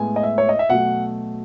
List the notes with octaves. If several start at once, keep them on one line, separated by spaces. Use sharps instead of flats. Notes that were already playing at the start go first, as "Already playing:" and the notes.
Already playing: A2 G#3 B3 G#5
D#5
E5
C#5
D#5
E5
B2 F#3 A3 F#5